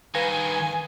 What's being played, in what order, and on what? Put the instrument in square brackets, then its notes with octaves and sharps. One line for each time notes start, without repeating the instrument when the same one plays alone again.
[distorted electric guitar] G2 D#3 [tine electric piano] B4 F5 A#6 [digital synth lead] G#5